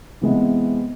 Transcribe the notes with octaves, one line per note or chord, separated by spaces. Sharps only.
C3 E3 G#3 B3